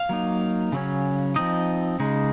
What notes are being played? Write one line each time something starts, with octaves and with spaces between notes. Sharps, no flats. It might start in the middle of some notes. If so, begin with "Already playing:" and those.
Already playing: F5
F#3 A#3 D#4
C#3 F#3 C#4
F3 C4 D#4 D#5
C#3 G#3 D#4